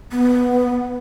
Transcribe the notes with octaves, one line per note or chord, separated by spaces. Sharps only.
B3